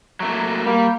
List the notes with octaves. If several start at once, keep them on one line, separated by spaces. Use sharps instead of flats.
F#3 A3 A#3
G3 A#3